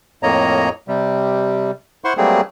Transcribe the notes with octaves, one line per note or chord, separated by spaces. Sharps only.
F2 A2 A#3 C#5 D#5 A#5
C3 G3
E4 C5 F#5 C6 C#6
F#3 G3 A3 A#3 C4 G#4